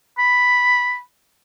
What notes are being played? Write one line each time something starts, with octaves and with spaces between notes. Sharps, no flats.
B5